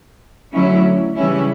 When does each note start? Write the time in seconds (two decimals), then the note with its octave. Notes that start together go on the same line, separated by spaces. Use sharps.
0.53 D3 F#3 A3 C#4 E4
1.16 C#3 E3 G3 C#4 E4